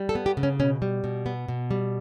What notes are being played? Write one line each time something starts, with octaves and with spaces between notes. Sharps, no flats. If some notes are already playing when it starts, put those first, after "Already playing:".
Already playing: G3
A4
B3
G4
C#3
C#4
B2 C#4
G3
B2
B3
B2
G3